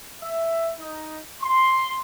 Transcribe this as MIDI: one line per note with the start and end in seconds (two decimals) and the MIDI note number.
0.22 0.72 76
0.80 1.21 63
1.42 1.99 84